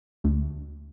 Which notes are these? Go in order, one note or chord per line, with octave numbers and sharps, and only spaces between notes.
D2